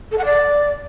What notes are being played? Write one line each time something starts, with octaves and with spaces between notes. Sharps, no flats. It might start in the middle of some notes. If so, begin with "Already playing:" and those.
A4
F#5
D5